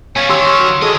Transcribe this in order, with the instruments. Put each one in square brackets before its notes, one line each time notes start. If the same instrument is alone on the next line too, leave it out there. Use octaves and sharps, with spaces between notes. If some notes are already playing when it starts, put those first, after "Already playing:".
[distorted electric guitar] G3 B3 [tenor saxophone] C#4 [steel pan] F5 G#5
[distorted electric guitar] D#3 [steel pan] G4 [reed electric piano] C6 C#6 E6
[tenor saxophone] F#3
[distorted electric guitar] D3 D#5 [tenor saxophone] G#3 [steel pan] G#4 A4 C#5